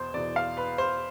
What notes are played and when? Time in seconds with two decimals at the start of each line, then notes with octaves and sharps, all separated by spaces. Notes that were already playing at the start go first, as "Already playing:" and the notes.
Already playing: E2 B2 C5
0.14 E2 B2 D5
0.36 F5
0.57 B4
0.78 C5